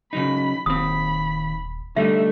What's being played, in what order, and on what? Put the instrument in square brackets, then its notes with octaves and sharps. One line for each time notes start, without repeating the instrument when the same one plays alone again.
[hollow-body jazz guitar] C#3 F#3 D#4 [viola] B5
[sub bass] D#1 [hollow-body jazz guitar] D#2 C4 [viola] B5 [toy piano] D#6
[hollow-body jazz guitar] D3 G3 D#4 [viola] A3 [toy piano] E5